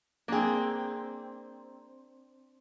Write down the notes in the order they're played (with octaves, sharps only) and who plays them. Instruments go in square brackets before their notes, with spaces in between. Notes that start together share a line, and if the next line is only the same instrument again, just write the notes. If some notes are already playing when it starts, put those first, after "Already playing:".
[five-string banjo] A#3 G#4 [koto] C4 D4